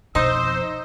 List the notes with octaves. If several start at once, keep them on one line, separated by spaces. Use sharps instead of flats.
F2 B2 D#4 C5 E6